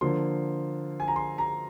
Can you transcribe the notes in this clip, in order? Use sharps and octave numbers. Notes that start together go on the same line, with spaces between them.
D3 F3 A#3 C6
G#5
A#5
C6
A#5